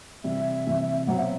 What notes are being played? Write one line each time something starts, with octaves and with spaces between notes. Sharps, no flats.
C3 E3 G3 E5
C3 E3 G3
B2 F#3 C4 F#5
E5